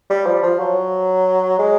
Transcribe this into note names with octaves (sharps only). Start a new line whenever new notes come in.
G3
F3
F3
F#3
G#3